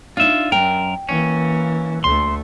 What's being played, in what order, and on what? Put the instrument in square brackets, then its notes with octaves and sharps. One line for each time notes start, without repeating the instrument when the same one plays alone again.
[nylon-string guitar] D4 D#4 [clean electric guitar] F4 E5
[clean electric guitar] F#2 A#4 [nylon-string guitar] G5
[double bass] E3 A#3 [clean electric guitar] C#4
[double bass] D2 A3 [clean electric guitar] C6